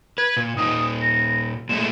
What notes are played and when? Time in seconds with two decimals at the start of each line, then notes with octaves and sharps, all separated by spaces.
0.18 B4 G#6
0.37 A#2
0.57 A#2 D#4 D#6
1.01 A#6
1.69 A#2 G#3 A3 E7